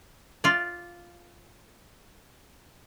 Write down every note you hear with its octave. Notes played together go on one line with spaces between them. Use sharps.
F4 D5